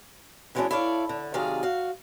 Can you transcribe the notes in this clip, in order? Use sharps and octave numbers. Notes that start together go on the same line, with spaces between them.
D3 E3 F#3 G#3 C#4 D4
E4 A4 C#5 D5 F5
D3
C3 D#3 F#3 G#4 D5 F5
F#4 F5